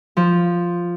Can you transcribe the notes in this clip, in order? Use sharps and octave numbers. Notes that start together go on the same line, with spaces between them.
F3